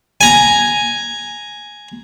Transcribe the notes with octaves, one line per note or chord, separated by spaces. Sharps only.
G#5 A#5